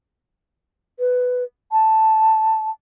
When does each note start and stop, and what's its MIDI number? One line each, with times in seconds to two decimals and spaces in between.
1.00 1.44 71
1.72 2.70 81